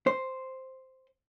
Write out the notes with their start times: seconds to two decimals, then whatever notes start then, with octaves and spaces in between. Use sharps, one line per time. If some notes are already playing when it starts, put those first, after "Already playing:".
0.07 C5